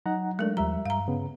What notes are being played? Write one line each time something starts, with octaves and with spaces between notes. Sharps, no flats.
F#3 D#4 F#5 A#5
G#3 A3 D4 A#4
D#2 F3 G3 E5 A#5
G2 F5 A#5
C#3 B3